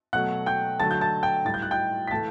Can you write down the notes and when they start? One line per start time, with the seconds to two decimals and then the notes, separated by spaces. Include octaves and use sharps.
0.13 B2 F#3 A3 F#5 F#6
0.46 G5 G6
0.79 D3 F#3 A3 A5 A6
0.91 G6
1.01 A5 A6
1.23 G5 G6
1.45 A2 G3 A6
1.54 G6
1.62 F#6
1.71 G5 G6
2.08 B6
2.11 A2 E3 A3 A5 A6